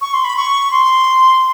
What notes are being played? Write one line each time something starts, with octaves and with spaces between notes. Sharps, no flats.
C#6
C6
B5
C#6
C6